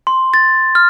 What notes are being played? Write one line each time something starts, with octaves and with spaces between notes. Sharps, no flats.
C6
A6
F6